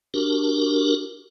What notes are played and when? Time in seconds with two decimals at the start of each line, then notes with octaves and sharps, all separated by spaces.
0.14 D4 F#4 G4 A#4